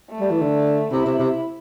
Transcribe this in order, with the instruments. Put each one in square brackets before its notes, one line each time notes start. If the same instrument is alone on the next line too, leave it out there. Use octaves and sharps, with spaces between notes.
[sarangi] A3
[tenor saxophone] G3
E3
D3
[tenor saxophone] C3 [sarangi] E4
[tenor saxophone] C3
C3